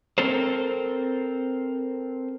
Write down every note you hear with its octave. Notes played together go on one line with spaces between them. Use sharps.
C4 A4 A#4 C5